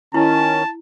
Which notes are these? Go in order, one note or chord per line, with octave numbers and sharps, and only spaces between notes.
D#3 C#4 E4 A5